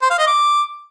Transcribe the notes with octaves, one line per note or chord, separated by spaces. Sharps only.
C5
F5
D#5
D6